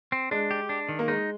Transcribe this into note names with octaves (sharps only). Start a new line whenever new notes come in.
C4
G#3 D4
G4
D4
D#3
A#3
G#3 D#4